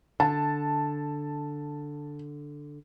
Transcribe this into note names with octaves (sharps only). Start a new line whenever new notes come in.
D3 A5